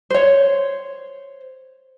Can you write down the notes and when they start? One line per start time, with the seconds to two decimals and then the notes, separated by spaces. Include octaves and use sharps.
0.10 C5 C#5